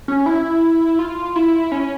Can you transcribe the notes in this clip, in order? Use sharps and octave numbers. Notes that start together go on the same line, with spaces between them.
C#4
E4
F4
E4
C#4